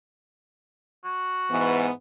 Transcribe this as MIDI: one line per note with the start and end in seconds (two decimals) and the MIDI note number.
1.04 1.85 66
1.52 1.91 44
1.52 1.91 52
1.52 1.91 59